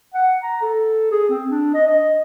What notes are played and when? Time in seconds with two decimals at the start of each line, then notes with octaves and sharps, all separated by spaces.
0.14 F#5
0.43 A#5
0.62 A4
1.12 G#4
1.29 C4
1.50 D4
1.74 D#5
1.88 D#5